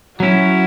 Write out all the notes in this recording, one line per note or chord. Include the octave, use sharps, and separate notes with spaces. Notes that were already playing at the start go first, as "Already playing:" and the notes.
F#3 C#4 E4 F#4